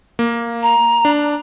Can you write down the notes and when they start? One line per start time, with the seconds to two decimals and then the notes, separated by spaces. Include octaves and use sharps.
0.19 A#3
0.63 A#5
1.05 D4